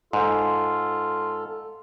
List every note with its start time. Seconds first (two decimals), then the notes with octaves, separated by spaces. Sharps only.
0.13 G#2 F4 A4